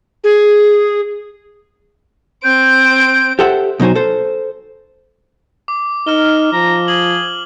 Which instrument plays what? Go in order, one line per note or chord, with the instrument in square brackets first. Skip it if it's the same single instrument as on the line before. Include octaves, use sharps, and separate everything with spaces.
[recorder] G#4
[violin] C4 D7 [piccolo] G6
[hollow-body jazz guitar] G4 A4 C5 E5 F#5
B2 F#3 D#4 C5 G#5
A4 C5
[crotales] D6
[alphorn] D#4 [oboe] A#4 [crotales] F6 E7 G7
[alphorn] F3 [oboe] A#5
[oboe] G#4 [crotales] F#7